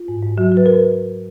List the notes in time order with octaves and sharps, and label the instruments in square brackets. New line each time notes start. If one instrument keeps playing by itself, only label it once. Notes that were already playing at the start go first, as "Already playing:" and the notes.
Already playing: [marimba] F4
G#2
G#2
F#3 F#4
F#3
B4
A#4